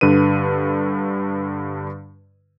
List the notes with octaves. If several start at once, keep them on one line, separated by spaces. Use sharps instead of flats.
G2 D3 B4 D#7